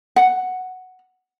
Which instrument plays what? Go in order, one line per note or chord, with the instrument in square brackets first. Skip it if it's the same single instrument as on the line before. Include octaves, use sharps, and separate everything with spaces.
[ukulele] F#5